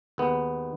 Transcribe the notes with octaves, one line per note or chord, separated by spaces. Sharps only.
D#2 D#3 G#3 B3